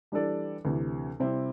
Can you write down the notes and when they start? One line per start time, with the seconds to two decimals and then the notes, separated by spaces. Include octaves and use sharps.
0.12 E3 G3 D4 A4 D5
0.65 D2 C3 E3
1.20 C3 G3 C4 E4